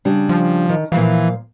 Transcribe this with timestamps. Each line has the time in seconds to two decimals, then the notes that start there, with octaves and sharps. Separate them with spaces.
0.05 C#3 G3 D4
0.29 F3
0.69 D#3
0.92 A#2 E3 F3 F5